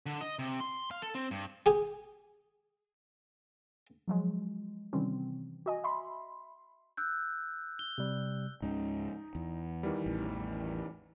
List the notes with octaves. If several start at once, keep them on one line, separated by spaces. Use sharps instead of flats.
D3
D#5
C3
C6
F5
A4
C4
G2
G4 G#4
F3 F#3 G#3
C3 D#3 E3 G3 C4 C#4
F#4 D#5 G#5
E5 B5 C6
E6 F#6 G6
G7
C3 G3
C#2 G#2 C#3 D#4
E2
D#3 E3 G3
A1 E2